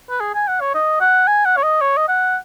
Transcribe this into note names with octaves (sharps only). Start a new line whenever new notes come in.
B4
G#4
G#5
F#5
C#5
D#5
F#5
G#5
F#5
C#5
D#5
C#5
D#5
F#5